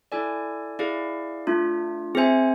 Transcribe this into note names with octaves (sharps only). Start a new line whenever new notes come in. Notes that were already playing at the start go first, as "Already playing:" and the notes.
E4 A4 D5 G#5
E4 G#4 D5 F5
A3 D4 F4
C4 G#4 C5 E5 G#5